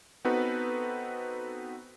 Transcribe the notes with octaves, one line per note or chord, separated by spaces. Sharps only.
B3 C4 D#4 F#4 A4 B4